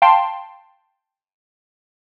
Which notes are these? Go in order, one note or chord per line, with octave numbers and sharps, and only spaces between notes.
F5 G5 A5 C6